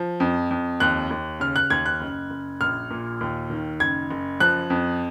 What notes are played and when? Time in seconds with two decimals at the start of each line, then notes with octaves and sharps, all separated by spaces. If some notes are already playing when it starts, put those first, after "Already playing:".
Already playing: F3
0.20 F2
0.51 F2
0.80 D#2 F#6
1.11 D#2
1.40 C#3 F6
1.56 F#6
1.70 D#2 G#6
1.86 F#6
2.01 F#1
2.30 F#1
2.61 A#1 F6
2.91 A#2
3.21 D#2
3.50 D#3
3.80 F#1 G#6
4.11 F#1
4.40 F3 F#6
4.70 F2